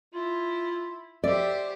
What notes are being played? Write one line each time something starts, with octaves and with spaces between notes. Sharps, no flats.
E4 F4
G4 C5 D5 E5